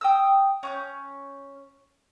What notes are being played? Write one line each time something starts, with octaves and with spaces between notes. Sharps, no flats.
G5 D#6 E6
C#4 D6 G6